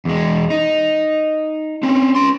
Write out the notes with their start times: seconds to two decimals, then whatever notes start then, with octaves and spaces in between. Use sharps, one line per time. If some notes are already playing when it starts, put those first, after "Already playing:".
0.05 E2 G#3
0.50 D#4
1.83 C4 C#4
2.15 C#4 C6